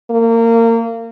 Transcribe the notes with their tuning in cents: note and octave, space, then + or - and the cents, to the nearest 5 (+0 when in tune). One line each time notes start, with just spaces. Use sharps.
A#3 -25